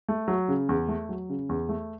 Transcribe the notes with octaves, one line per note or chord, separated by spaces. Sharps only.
A3
F#3
C#3
E2
A3
F#3
C#3
E2
A3